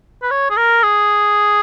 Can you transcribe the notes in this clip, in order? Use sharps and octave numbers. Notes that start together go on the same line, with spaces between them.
B4
C#5
G#4
A#4
G#4